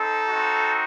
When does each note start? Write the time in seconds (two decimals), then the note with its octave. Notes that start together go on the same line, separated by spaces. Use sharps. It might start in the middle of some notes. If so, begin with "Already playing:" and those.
Already playing: C4 D#4 A4
0.29 C4 D#4 F#4